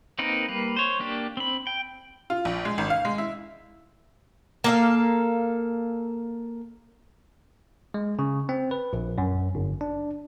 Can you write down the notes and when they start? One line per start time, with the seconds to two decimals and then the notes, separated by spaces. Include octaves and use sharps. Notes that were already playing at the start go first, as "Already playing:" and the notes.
0.19 A#3 C4 D#4 A#4 B4
0.49 G3 A#3 B4
0.76 C5 C#5
1.00 A#3 D4 G4
1.37 C4 B5
1.67 G5
2.30 F4
2.45 A#1
2.65 G#3
2.78 G#1
2.90 F5
3.05 G#3
3.18 E4
4.64 A#3 A4 F5
7.94 G#3
8.19 C#3
8.49 C4
8.71 B4
8.93 A#1
9.18 F#2
9.55 G1
9.81 D4